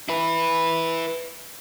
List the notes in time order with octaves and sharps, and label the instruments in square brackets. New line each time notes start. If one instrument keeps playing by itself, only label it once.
[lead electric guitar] E4 B4